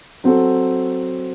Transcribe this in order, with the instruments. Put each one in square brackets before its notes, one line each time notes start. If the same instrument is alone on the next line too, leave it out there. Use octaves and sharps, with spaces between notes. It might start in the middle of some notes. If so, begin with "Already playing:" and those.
[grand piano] F#3 C4 F#4 A4